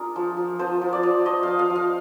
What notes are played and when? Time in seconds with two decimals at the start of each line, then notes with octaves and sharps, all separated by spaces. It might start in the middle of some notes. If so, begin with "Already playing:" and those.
Already playing: D4 F4 G#4 A#4
0.16 F3
0.37 F3
0.59 F3 C5
0.81 F3
0.93 D5
1.03 F3
1.26 F3 D#5
1.43 F3 F5
1.59 F5
1.70 F3
1.76 F5